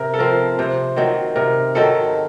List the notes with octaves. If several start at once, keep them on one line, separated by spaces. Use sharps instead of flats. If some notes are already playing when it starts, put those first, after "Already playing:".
Already playing: C3 A#4
A4
F3 C4 A#4
C3 C5
D#3 F#3 C4
C3 A#4
D#3 F#3 C4 A4